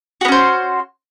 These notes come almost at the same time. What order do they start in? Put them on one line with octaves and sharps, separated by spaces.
F#4 B3 C#4 C5